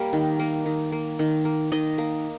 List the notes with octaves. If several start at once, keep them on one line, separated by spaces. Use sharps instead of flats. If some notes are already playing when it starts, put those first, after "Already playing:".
Already playing: G3 A#3
D#3
A#3
D#3
A#3
D#3
A#3
D#3 D#5
A#3